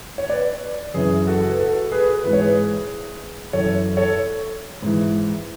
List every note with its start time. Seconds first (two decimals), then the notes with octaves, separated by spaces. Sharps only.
0.18 C#5
0.30 B4 D5
0.94 F#2 C#3 E3 G#4 B4
1.27 F#4 A4
1.50 B4
1.60 F#4 A4
1.92 G#4 B4
2.24 G#2 E3 B4
2.33 C#5
2.41 G#4 B4
3.53 F#2 E3 A4 C#5
3.97 A4 C#5
4.82 G#2 E3